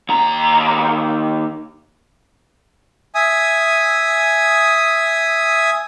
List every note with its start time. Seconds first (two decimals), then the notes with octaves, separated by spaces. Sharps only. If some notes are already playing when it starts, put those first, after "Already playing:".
0.09 D#2 A#5
3.15 E5 G#5 D#6